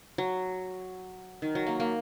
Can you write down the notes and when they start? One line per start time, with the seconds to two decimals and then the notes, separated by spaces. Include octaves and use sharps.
0.18 F#3
1.42 D#3
1.55 F#3
1.67 A#3
1.80 A#3